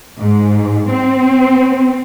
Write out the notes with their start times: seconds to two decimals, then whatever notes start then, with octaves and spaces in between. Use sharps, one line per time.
0.20 G#2
0.90 C4